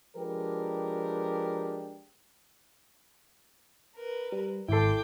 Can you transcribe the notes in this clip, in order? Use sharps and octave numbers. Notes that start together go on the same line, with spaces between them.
F3 G#3 D4 G4 A#4 B4
A#4 B4
G3
G#1 E4 A4 G5 C6 D6